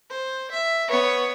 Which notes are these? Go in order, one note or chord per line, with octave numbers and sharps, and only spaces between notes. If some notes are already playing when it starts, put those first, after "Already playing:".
C5
E5
B3 C#5